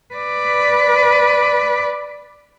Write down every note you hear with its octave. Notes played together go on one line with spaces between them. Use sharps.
B4 D5